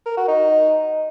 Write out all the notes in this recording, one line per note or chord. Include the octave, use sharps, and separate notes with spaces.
A#4
F#4
D#4